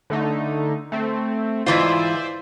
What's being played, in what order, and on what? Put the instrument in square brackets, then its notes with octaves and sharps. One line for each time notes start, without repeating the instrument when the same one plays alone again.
[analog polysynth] D3 A3 D#4
A3 C4
[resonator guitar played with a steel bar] G#2 E3 F4 [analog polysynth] C5 D5 E5